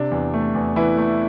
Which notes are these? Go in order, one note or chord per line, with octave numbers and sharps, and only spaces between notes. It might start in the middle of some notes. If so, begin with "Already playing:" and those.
Already playing: C3 D4
E2
A3
E2
E2 E3 E4
A3